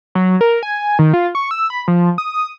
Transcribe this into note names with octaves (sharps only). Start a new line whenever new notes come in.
F#3
A#4
G#5
D#3
F4
C#6
E6
B5
F3
D#6